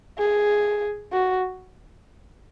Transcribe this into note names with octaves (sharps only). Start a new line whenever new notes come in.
G#4
F#4